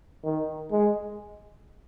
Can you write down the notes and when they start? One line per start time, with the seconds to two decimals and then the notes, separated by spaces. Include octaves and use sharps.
0.24 D#3
0.71 G#3